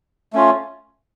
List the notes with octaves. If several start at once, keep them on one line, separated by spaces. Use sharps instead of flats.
A3 C#4 F4